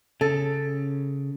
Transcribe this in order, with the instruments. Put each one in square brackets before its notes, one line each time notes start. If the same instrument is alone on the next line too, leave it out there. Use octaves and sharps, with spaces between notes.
[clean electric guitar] C#3 [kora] A4